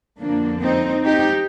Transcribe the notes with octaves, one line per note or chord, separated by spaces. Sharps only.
F2 D3 F3 A#3 D4
C4 D#4
D#4 G4